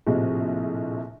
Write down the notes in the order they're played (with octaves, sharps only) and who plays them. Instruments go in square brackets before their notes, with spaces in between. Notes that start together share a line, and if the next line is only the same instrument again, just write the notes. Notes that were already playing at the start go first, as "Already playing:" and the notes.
[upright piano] A#1 A2 C3 F3 G#4 D#5